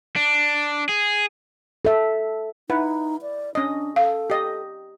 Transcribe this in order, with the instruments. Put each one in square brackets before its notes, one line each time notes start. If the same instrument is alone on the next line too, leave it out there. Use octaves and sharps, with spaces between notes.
[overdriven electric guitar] D4
G#4
[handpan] A4 E5
[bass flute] D#4 [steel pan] E4 B4 F#5
[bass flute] D5
[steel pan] C#4 D#5 [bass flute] D4
[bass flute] A4 [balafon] F5
[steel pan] G4 D#5